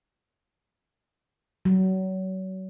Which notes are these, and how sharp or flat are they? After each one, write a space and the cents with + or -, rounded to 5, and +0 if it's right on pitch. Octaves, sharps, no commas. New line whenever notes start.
F#3 +30